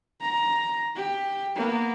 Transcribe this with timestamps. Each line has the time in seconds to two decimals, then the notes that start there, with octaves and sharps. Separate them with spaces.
0.21 A#5
0.95 G4
1.55 A#3 B3